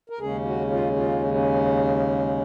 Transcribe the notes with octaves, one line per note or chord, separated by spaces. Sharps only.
A#4
D#2 C#3 G#3 C#4 G#4
F#4
F4
F4
C#4